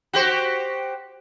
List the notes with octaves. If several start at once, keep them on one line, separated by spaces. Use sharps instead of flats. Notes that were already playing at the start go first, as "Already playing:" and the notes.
F#4 G4 C5